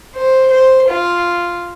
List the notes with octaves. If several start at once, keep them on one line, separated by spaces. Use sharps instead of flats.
C5
C5
F4